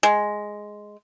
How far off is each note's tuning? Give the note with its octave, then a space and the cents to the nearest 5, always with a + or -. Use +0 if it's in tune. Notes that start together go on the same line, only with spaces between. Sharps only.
G#3 +5